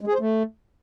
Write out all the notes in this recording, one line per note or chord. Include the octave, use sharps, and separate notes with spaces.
G#3
G#4
C5
A3